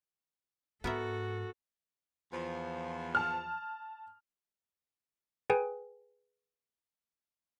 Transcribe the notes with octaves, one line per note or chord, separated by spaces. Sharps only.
G#2 B3 F#4 A4 A#4 E5
E2 F3
A5 F6
G#4 B4 G5 G#5